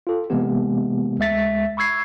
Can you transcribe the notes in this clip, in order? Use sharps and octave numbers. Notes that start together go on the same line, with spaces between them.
F4 A4
C3 E3 G#3 A#3 B3 G4
D2 G#3 E5 A6 B6
B5 C#6 E6 G#6 C7